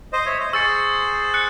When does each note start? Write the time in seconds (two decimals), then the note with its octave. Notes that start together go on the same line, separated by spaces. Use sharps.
0.13 C5 D#5
0.26 C#5 E5
0.39 C5 D#5
0.53 G#4 C5 C#6 E6 A6 C#7
1.34 F#6 C#7